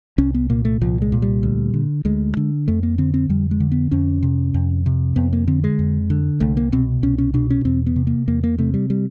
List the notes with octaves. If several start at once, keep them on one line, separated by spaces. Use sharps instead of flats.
C2 C#4
B3
A#2 A#3
A3
C2 F3
G#3
A#2
G3
D2
D3
D2 G#3
D3
F2 A3
A#3
D3 C4
C4
F2 G3
G#3
D3
B3
F2 C#4
C3
F2
C3
F2 B3
A#3
D3 C4
G#3
F2
D3
C2 A3
A#3
B2 C4
C2 C#4
C#4
B2 D4
C#4
E2 C4
B3
C3
A#3
E2 A#3
A#3
C3 A3
G3
G3